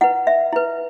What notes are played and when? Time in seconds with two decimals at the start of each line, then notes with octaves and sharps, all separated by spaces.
0.01 E4 B4 F#5
0.27 E5
0.53 E4 B4